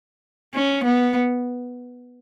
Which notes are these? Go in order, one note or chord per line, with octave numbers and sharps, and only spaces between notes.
C#4
B3